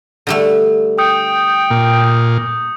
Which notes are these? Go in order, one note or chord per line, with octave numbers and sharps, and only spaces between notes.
D3 G3 A3
G5 D#6 G6 C#7
A#2